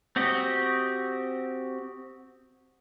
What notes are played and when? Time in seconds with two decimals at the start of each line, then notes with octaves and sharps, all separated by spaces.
0.16 C4 F#4 G4 D#5